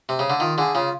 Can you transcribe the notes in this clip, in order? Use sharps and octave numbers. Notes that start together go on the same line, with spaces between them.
C3
C#3
D3
D#3 F4
D3 G#4
C#3 F4